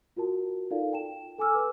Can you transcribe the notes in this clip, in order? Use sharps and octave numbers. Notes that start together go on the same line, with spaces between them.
F4 F#4 A#4 A5
D#4 F4 A4 A#4 D5 F5
G5 A5 E7
A4 G#5 D6 E6 F6
B4 E6